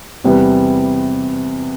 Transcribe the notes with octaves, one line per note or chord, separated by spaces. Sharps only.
E2 C3 G3 B3